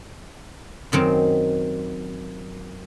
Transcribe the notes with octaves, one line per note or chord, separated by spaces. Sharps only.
F#2 D#3 F#3 C4